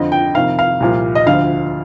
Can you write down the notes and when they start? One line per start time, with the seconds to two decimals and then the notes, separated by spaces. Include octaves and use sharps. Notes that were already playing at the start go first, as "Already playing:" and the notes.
Already playing: F2 D3 F3 D#5
0.12 G5
0.35 F2 C3 D#3 F5
0.59 F5
0.80 C2 A#2 F3
1.15 D#5
1.26 D2 D3 F3 F5